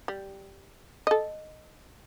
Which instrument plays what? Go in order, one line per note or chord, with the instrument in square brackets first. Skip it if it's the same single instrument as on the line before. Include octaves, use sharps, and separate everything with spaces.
[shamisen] G3
A4 D#5